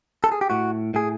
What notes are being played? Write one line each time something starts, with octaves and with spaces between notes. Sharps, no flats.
A4
G#4
G4
A2 F#4
A2 G#4